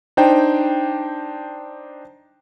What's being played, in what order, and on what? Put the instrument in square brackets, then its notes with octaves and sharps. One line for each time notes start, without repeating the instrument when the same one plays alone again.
[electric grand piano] D4 D#4 C5 G5